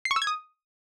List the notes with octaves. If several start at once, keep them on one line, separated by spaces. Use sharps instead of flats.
C7
C#6
E6
G#6
D#6